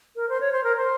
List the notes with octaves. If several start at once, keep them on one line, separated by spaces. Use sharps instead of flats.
A#4
C5
C#5
C5
A#4
C5